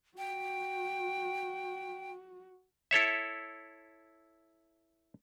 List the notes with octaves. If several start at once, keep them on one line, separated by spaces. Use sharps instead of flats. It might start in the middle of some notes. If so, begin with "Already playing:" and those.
F#4 G5
E4 A4 C#5 E5